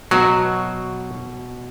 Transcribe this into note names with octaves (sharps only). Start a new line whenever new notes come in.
B2 F#3